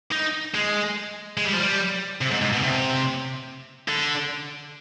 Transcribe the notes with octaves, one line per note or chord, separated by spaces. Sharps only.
D#4
G#3
G#3
G3
F3
G3
C3
G#2
G#2
B2
C3
D3